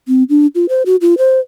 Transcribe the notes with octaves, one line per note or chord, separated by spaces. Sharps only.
C4
D4
F4
C5
F#4
F4
C5